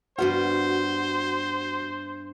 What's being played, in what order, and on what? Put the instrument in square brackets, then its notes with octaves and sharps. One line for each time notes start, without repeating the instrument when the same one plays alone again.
[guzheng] G2 B3 F5 [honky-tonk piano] F#4 [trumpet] C5